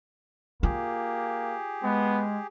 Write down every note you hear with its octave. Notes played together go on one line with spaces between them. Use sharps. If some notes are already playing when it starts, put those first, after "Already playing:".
A#3 F4 G4 G#4
G#3 B3